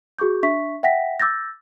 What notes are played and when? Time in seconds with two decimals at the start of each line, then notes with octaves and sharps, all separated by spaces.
0.19 F#4 G#4 C#6 D6 G6
0.43 D4 E5 C#6 B6
0.83 E5 F#5 G5 A#6 B6
1.20 D6 E6 G6 A6 A#6